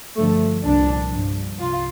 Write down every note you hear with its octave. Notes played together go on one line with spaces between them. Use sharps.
G2 D3 F3 A3
C2 A#2 F3 D4
G2 F3
C2 F4